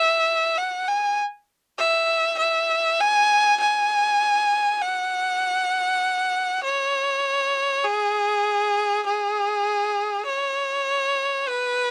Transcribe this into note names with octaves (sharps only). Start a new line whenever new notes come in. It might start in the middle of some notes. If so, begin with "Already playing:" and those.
Already playing: E5
F#5
G#5
E5
E5
G#5
G#5
F#5
C#5
G#4
G#4
C#5
B4